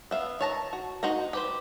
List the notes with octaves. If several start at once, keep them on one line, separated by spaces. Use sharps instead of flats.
B3 E5 F5
D#3 C#5 A5 A#5
F#4
A#3 D#4 F#4 C5 A#5
G4 B4 C5